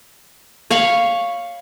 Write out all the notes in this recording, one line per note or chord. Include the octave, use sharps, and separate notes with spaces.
C#5 F5 B5 C#6